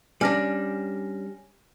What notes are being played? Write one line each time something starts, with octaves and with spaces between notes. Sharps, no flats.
G3 C#4 D4 G#5 F6 A#6